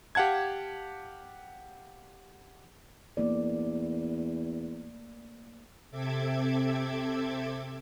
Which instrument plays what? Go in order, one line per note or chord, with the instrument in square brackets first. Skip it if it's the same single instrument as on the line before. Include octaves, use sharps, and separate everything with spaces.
[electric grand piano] G4 F5 F#5 A5 G#6
[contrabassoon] E2 [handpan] A3 A#3 D5
[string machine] C3 C4 A4 E5 D6 G#6